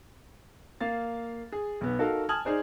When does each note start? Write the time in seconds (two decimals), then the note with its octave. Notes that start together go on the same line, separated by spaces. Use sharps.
0.81 A#3 F5 A6
1.52 G#4
1.81 B1 B3
1.99 D#4 F#4 A4 A#4 F5
2.29 G#5 A5 D#6 F6 G#6 F#7
2.45 D#4 G#4 C5 D5